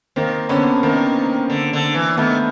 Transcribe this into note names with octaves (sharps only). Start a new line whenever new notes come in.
D#3 A#3 C4
D3 B3 C#4
D#3 A#3 C4
D3
D3
E3
D#3 A3 B3